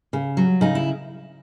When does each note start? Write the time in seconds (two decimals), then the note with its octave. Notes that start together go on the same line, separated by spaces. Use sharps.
0.13 C#3
0.37 F#3
0.61 C#3 D#4
0.75 E4